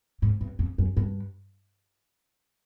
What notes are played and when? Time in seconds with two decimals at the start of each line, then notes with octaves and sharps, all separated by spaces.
0.22 G#2
0.41 G2
0.59 F2
0.78 F#2
0.97 G2